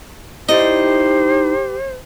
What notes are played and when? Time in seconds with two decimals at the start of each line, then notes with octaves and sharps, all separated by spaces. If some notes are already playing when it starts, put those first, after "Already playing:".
0.49 D#4 E4 G4 C5 D5 D#5